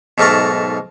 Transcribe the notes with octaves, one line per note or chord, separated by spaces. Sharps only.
B1 G#2 A3 A#4 A5 C#6